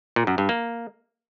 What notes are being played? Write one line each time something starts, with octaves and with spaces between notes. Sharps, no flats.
A#2
F#2
G2
A#3